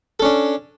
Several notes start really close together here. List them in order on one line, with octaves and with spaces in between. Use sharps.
A4 C#4 D4